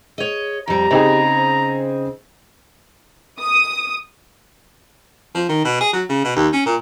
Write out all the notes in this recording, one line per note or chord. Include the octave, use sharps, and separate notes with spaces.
G#4 C#5 D#5
F2 G3 G4 A#5
C#3 C4 D#4 G#4
C5
D#6
F3
D#3
B2
G#4
F#3
C#3
B2
D#2
C#4
A#2